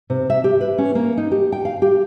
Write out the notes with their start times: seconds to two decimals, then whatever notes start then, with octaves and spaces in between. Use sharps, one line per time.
0.10 C3
0.30 E5
0.44 G4
0.61 B4
0.78 C#4
0.95 A#3
1.17 D#4
1.31 G4
1.52 G5
1.65 F5
1.82 G4